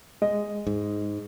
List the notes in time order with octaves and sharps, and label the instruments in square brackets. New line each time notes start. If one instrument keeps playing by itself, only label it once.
[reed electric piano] G#3 [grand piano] D#5
[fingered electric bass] G#2